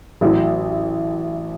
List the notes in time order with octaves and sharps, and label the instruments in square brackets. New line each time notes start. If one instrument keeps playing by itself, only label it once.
[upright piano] A1 A2 F#3